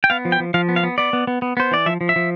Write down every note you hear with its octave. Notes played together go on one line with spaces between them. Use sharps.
G5
B3 F5
F3
G5
F3
F3 F5
B3
F5
B3
B3 D5
B3
B3
B3
B3 C5
E3 D5
F3 E5
F3
E5
F3